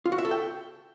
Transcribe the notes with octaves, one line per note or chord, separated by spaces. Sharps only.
F4
F#4
E5
A4
G5